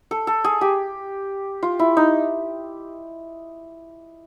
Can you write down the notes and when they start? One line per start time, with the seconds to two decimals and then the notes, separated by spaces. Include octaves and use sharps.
0.11 A4
0.27 A4
0.44 G#4
0.61 G4
1.63 F4
1.79 E4
1.97 D#4